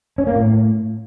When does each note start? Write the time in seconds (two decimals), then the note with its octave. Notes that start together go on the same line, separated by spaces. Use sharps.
0.18 C#4
0.27 A#3
0.35 A2